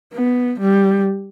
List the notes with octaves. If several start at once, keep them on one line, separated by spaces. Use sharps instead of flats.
B3
G3